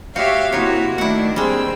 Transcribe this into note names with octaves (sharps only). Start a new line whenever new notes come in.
F#4 G4 C#5 E5 F5
C3 A#3 D#4 E4 F#4 C#5
D#3 A3 D4 E4 F#5
D#2 G3 G#3 C4 E6